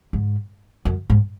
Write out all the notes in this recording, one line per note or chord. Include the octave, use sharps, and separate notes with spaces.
G#2
F#2
G#2